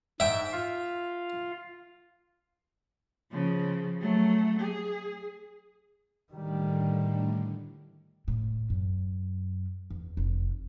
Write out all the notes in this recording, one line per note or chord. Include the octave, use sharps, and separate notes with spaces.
G#2 E5 G5
F4 F5
C#3 F3
F#3 A3
G#4
A2 D3 D#3 G3
A2
F#2
E2
F1